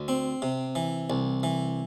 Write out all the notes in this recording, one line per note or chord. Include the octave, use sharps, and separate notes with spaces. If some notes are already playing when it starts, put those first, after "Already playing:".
Already playing: D2
C4
C3
E3
C2
E3